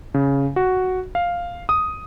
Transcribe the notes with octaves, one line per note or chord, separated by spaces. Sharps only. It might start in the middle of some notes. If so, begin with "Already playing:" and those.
C#3
F#4
F5
D#6